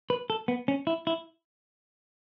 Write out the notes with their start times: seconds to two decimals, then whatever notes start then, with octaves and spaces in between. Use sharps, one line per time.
0.10 B4
0.30 A4
0.48 B3
0.68 C#4
0.87 E4
1.07 E4